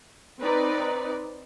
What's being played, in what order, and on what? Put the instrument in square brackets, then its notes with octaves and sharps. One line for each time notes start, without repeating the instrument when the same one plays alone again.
[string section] C4 D#4 B4 D5